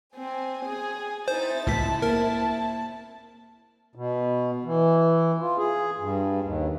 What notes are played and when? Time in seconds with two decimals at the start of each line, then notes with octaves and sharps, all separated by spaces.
0.16 C4 G#5
0.66 G#4
1.28 C4 D#4 E4 C5 A6
1.67 C#2 A2 C#3 C4 E4 A5 B6
2.02 A#3 A#4 A5
3.95 B2
4.65 E3
5.40 F4
5.58 G#4
5.99 G2
6.42 D#2